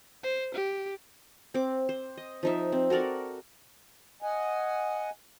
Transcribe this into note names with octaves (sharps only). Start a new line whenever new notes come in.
C5
G4
C4 D6
C5
D#5
F3 D#4 E5
C4
F#4 A4 A#4 D5
D#5 F#5 G#5